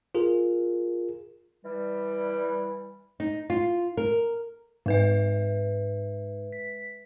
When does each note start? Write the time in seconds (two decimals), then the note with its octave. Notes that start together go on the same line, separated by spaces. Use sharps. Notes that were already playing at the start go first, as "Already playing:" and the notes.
0.15 F4 G#4 A#4
1.64 E3 G3
3.20 D#4
3.50 F4
3.97 A#4
4.86 G#2 G#3 B4 E5
6.53 B6